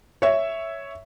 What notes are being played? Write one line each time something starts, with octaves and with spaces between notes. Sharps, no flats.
C#5 E5